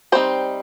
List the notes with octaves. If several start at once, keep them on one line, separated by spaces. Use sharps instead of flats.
G3 C4 D#4 C5